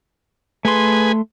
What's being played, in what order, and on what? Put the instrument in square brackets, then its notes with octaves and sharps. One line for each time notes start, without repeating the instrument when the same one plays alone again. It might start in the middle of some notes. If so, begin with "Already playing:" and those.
[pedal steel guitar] A3 C6 [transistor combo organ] G#4 B4 G#5